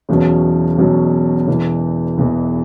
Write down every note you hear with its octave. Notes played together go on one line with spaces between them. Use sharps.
E1 E2 B2 F#3 C#4
E1 E2 B2 F#3 C#4
E1 E2 E3
E1 E2 E3